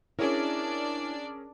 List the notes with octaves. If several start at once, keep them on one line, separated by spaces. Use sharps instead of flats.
C#4 D4 E4 G#4 A#4 C#5 D5